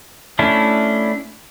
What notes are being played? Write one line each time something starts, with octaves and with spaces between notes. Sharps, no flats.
A3 C#4 D4 E4